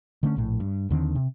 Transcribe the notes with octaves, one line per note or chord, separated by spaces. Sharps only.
D3 A3 C#4
A#1 A2
G2
D#2 D3 D#3 C4
C3